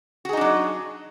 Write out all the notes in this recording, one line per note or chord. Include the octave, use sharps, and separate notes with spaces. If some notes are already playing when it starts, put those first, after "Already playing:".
F#3 D4 D#4 F#4 G#4